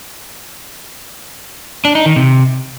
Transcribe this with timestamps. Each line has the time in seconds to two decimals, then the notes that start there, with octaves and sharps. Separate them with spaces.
1.85 D4
1.95 D#4
2.06 D#3
2.16 C3